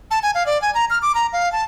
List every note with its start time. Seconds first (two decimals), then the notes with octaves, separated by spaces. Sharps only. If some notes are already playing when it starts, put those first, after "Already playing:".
0.11 A5
0.23 G#5
0.35 F5
0.46 D5
0.62 G#5
0.75 A#5
0.90 F6
1.02 D6
1.15 A#5
1.33 F5
1.52 A5